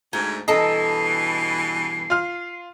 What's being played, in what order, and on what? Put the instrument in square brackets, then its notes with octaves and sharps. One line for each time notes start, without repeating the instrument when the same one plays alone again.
[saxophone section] D2 G#2 [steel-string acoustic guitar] D#4 [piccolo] G#6
[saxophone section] G2 B2 E3 [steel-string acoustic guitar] A4 A5 A#5 [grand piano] D#5 [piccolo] C7
[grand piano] F4 F6